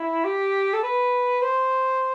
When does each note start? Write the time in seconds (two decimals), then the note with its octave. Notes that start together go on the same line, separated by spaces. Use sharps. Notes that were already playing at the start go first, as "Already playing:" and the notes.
Already playing: E4
0.25 G4
0.73 A4
0.83 B4
1.42 C5